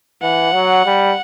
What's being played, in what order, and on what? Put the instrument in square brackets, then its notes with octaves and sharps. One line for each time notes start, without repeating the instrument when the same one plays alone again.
[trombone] E3 [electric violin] F#5
[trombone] F#3
G3